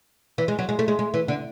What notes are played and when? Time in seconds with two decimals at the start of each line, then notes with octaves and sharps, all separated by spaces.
0.38 E3
0.48 G#3
0.59 F#3
0.69 G#3
0.79 A3
0.88 G#3
0.99 G#3
1.14 E3
1.28 D3